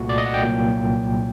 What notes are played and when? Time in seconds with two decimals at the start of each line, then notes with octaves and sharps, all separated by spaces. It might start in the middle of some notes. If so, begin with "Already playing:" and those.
Already playing: C2 A#2 A3 F#4
0.09 D5
0.18 D#5
0.26 F#5
0.34 G5
0.42 C2 A#2 F#3 A#3